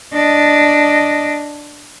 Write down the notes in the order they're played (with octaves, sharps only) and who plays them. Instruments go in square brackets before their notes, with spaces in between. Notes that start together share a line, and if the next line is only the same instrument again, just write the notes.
[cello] D4 D#5